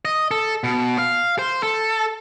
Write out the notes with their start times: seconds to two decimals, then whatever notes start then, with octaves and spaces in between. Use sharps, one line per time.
0.05 D#5
0.31 A4
0.64 B2
0.98 F5
1.39 C5
1.63 A4